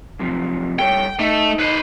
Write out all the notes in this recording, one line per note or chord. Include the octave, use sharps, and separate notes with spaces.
F#2 C3 F3
G2 A4 C#5 G5
A3 D#4
B4 C5